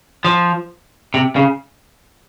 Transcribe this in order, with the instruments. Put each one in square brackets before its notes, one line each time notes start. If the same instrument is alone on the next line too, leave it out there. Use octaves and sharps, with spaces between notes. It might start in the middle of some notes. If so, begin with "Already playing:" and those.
[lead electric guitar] F3
C3
C#3